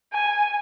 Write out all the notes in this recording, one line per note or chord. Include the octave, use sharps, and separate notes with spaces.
G#5